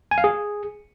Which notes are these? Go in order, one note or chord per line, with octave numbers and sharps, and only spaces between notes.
G#5
F5
G#4